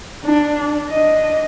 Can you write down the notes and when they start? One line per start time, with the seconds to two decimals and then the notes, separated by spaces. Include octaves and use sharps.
0.25 D4
0.91 D4 D#5